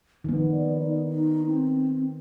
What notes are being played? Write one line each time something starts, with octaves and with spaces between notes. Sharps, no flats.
D#3 F3 B3
D5
D#4
D#4
C4